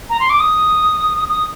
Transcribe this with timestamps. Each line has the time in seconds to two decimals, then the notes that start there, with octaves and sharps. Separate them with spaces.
0.10 A#5
0.20 C6
0.30 D6
0.40 D#6
1.28 D#6